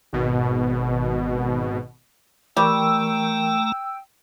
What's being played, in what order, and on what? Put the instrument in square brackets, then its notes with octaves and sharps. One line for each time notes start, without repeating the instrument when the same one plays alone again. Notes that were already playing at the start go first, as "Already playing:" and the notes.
[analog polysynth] G#1 B2
[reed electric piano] E3 A#4 C#6 [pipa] G3 [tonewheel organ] A3 A#5 [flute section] G5 E6